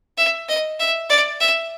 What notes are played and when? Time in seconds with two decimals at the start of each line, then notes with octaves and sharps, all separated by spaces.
0.18 E5
0.48 D#5
0.80 E5
1.09 D5
1.40 E5